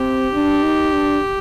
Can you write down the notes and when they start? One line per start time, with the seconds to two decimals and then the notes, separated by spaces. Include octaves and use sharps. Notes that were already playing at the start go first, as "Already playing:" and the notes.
Already playing: C4 G4
0.33 D4
0.63 D#4
0.93 D4